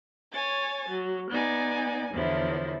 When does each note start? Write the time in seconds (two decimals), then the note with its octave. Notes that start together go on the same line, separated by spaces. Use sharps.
0.32 C#5 G#5 A6
0.89 F#3
1.31 B3 D#4 D5 G#5
2.13 E2 D3 F3 F#3 E4